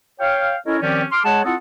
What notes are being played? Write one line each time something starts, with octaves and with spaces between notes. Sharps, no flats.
C#5 F5 G5
C#4 E4 A4 A#4 C#5 D#5
D#3 F3 C4 C#4 G4 D5
C6 D6 F6
G#3 G#4 C#5 F#5 A5
C4 E4 F4 A4 D#5 F#5